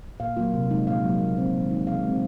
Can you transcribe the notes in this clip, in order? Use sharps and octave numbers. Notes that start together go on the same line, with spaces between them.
A#2 F5
F#3 A#3 F4
C3
F3 G#3 D#4
A#2 F5
F#3 A#3 F4
C#3
F3 C4 D#4
D#3
G#3 D#4
C#3 F5
G#3 C4